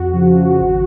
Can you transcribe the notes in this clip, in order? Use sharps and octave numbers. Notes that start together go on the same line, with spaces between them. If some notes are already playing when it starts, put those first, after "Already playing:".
Already playing: F2 F#4
C#3 F3
G#1